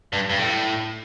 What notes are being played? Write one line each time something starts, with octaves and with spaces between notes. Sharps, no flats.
G2
G2
A2